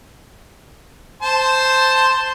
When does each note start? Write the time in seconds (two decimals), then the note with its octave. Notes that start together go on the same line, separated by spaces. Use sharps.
1.22 C5 A5 C6